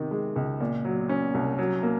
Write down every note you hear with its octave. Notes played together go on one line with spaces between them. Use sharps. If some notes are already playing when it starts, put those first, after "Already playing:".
Already playing: C3 D#3
G#3
C#2
A#2
F#3
C#4
C2
F#3
A#3